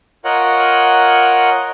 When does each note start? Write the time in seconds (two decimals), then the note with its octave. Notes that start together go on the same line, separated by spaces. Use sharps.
0.25 F4 A#4 C#5 D#5 F#5